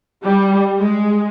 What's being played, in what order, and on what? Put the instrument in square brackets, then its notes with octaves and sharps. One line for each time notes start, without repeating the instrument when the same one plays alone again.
[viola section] G3
G#3